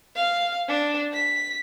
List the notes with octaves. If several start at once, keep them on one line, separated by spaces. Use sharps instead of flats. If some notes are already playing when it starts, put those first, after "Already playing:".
F5
D4
B6